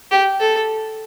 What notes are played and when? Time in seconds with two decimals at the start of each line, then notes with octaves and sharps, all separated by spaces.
0.11 G4
0.40 A4